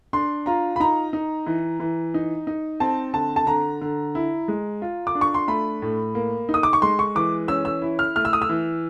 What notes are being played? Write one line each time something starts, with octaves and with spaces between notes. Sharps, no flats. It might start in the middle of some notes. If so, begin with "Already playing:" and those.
D4 C6
F4 A#5
B5
D#4 A#5
D#4
E3
E3
D#4
D#4
C4 A5
D3 A5
A5
D3 A#5
D3
E4
G#3
F4
D6
D4
C#6
C6
A3 B5
A2
A#3
D#4
D#6
D6
C#6
G#3 C6
C#6
E3 D6
C#4 E6
E6
E4
F6
A3 F6
E6
D#6
E6
E3